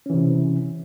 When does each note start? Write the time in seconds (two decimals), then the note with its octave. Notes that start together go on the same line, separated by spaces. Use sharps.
0.06 C#4
0.10 E3
0.14 C3